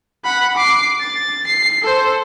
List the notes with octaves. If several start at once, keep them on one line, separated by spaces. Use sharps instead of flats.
F#5 B5
D6 C7
A6
C7
A4 C5